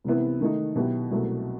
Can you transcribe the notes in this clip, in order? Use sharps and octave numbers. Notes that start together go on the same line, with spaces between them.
C2 C3 E3 B3 E4
D#3 A3 D#4
B2 F#3 B3 E4 G4
C2 B2 F#3 A3